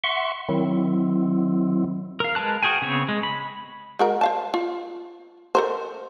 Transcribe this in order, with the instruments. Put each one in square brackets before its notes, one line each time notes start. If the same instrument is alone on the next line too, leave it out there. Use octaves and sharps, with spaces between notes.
[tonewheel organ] E5 F#5 C6 C#6
D#3 F#3 C4 E4
[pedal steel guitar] A#4 F5
G#3 A#4 B4 A5 F#6
F#4 G#4 G5 G#5
C#3 B3 C4 C#5
G#3
B5
[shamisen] G#3 F#4 A#4
C5 F5 A5
F4
A4 A#4 C5